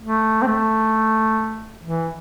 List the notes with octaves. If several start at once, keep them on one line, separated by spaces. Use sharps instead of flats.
A3
C4
A3
E3